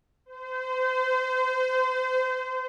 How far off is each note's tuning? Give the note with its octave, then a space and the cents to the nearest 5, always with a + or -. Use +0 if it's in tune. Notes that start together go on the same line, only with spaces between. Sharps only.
C5 -30